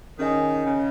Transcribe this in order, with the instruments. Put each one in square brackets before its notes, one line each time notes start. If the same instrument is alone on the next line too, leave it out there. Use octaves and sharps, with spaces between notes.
[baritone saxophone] D#3 [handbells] C#4 G#4 D#5 G#5
[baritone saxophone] C#3